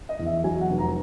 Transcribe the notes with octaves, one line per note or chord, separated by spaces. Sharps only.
D#5
E2
E5
F#3 G#5
F#5
F1
A#5